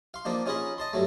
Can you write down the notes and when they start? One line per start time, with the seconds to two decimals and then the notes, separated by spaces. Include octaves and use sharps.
0.14 F5 C6
0.25 F3 A#3 D4 D#4
0.46 C#4 D#4 F4 G#4 D#5 B5
0.78 D#5 A5 C6
0.93 G2 F#3 A3